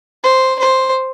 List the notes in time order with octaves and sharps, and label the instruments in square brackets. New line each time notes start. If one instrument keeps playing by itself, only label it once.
[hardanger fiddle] C5
C5